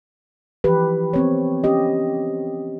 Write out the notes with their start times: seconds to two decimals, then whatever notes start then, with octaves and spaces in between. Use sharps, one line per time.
0.64 E3 F3 G4 B4
1.13 B3 C4 C#5
1.64 C#4 G4 D#5